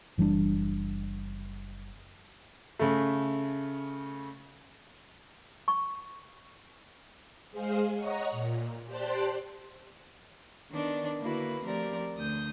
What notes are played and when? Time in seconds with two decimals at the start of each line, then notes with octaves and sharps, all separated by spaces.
0.18 F#1 E3 G3 D4
2.79 C#3 A3
5.68 C#6
7.51 G#3 G#4 C5 F5
7.95 C#5 D#5 F#5 A#5 C#6
8.31 A#2
8.87 G4 C5 D5 A5 C6 F#6
10.71 D#3 B3 D4 D5
11.19 D3 A#3 E4 F#4 B4
11.64 F3 A3 C4 G4 A#4 D5
12.16 D2 D#6 G6